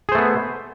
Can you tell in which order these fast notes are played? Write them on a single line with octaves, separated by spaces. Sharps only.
G#4 C5 A3 B3